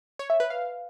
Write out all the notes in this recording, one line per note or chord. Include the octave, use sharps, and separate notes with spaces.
C#5
E5
B4
F5